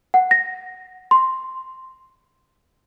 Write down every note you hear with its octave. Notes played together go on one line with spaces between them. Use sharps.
F#5
A#6
C6